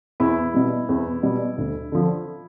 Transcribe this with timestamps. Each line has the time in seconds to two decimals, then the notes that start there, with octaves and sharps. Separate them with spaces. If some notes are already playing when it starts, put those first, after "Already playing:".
0.20 E2 E4
0.54 B2 G3
0.89 E2
1.23 B2 G3
1.58 D2
1.92 D3 F3